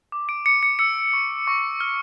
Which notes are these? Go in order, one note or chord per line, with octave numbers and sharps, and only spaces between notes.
D6
D7
D6 C#7
C#7
E6 C#7
C#6
C#6
F6